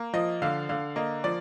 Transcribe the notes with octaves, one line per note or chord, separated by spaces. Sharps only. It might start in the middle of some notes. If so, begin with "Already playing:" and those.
Already playing: A#3
F3 D#5
D3 F5
D3 F5
A#3 D#5
F3 D5